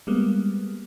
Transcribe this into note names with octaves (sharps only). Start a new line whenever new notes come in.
G3 G#3 A#3 B3